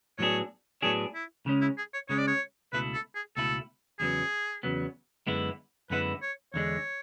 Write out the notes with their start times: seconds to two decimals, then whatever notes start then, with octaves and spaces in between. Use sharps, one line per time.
0.19 A2 F#3 B3 D4 G#4 C#5
0.82 A2 F#3 B3 D4 G#4 C#5
1.15 E4
1.46 C#3 G#3 C#4
1.62 E4
1.78 G#4
1.94 C#5
2.09 C#3 G#3 C#4 C#5
2.18 D5
2.27 C#5
2.73 C#2 B2 A3 E4 B4
2.94 A4
3.15 G#4
3.36 C#2 B2 A3 E4 A4
3.99 E2 C#3 F#3 B3 G#4
4.63 E2 C#3 F#3 B3
5.27 F#2 D3 G#3 B3 E4
5.90 F#2 D3 G#3 B3 E4 B4
6.22 C#5
6.54 E2 D3 G#3 C#5